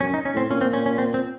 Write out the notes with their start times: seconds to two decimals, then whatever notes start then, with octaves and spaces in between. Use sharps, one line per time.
0.01 F#2 C#4
0.14 D#4
0.25 C#4
0.34 A2 C4
0.49 A#2 C#4
0.61 C4
0.73 C#4
0.86 C#4
0.98 C4
1.14 C4